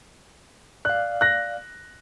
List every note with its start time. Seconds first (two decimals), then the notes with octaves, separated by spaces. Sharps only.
0.85 D5 F5 F#6
1.21 F#6 A#6